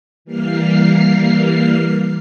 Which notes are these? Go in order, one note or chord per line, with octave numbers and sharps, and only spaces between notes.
E3 G3 A#3 F6 C7